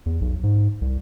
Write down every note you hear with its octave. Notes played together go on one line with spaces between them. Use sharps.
E2
B1
G#2
C2